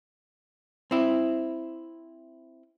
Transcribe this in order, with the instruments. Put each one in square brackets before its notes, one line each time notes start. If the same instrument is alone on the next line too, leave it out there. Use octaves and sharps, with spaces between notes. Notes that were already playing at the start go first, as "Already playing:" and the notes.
[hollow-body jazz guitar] C4 E4